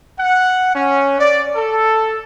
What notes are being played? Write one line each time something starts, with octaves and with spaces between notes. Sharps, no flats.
F#5
C#4
D5
A4